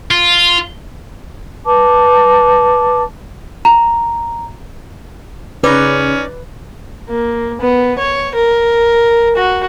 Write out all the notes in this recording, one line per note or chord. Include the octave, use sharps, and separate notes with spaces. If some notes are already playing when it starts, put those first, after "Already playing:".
F4
B4 A5 D6
A#5
C#3 C#4 D#4 B4 D5
A#3
B3
C#5
A#4
F#4